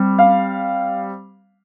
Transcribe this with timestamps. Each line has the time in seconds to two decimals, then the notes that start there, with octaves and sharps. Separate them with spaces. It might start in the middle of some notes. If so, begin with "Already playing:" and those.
Already playing: G3 C4
0.19 F5